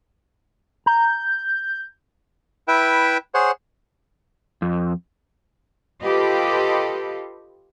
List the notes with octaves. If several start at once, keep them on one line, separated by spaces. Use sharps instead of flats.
A#5 G6
E4 B4 E5 G5
G#4 C5 C#5 F#5
F2
F4 G4 A4 B4 D#5